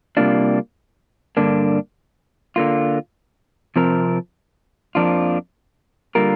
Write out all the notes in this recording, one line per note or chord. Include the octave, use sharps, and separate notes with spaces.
C3 G3 A#3 D4 F4
G2 D3 A#3 D4
D3 A#3 F4
C3 F3 C4 A#4
F2 F3 A#3 D4 F4
D3 G3 A#3 F4 A#4